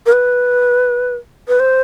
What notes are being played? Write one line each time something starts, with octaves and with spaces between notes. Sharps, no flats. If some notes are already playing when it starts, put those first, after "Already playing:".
A#4
B4
B4
C5